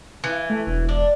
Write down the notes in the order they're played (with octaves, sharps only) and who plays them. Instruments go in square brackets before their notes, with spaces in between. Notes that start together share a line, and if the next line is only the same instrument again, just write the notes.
[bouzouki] E3
[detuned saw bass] A3
E1
[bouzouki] D4